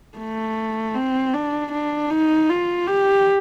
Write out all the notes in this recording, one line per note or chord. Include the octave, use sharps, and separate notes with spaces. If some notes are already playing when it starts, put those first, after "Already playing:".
A3
C4
D4
D4
D#4
F4
G4